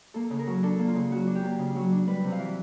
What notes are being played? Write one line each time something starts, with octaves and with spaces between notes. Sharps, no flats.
A#3 A4
C#3
A#4
F#3
D4 A4
A#3
F4
C#3
F#3 F#4
D4
G4
A#3
C#3
F#3
D4
G3 B4
C3
F5
E3